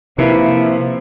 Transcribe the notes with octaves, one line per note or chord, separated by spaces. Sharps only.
C3 F3 A#3 E4 B4